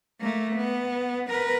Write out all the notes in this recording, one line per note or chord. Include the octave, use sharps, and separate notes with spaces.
A3 A#3
B3
A#4 B4